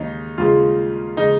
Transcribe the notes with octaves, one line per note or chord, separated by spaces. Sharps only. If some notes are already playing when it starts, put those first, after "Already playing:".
Already playing: D#2 C#3 G#3 D#4
D#2 C#3 G#3 F4
C#3 G#3 D#4